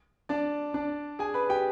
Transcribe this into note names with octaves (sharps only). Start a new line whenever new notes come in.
D4 D5
D4 D5
G#4 G#5
B4 B5
G4 G5